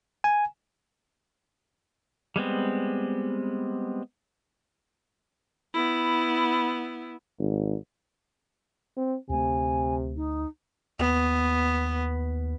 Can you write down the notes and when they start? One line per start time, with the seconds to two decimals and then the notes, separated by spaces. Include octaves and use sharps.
0.24 G#5
2.36 G3 G#3 B3 C4
5.73 B3 E4
7.38 G#1
8.97 C4
9.30 D2 C3 A3 G#5
10.16 D#4
10.99 D#2 B3